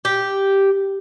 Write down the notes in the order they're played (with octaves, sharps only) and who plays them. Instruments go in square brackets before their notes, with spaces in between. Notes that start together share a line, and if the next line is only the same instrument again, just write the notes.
[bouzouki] G4